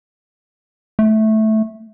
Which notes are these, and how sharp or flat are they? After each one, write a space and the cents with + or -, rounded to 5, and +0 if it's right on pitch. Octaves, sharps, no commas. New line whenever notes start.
A3 -10